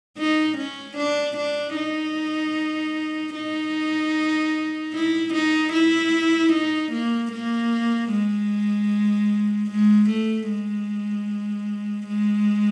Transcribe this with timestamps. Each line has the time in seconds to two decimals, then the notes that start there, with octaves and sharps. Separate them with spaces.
0.18 D#4
0.57 C#4
0.97 D4
1.37 D4
1.76 D#4
3.35 D#4
4.94 E4
5.34 D#4
5.73 E4
6.53 D#4
6.92 A#3
7.32 A#3
8.11 G#3
9.70 G#3
10.09 A3
10.49 G#3
12.08 G#3